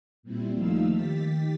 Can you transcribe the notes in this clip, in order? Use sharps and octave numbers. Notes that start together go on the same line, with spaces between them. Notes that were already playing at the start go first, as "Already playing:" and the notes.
A#2 G3 C4 E4
D#2 F3 A3 D#4 F5 E6
D#3 G4 A6 B6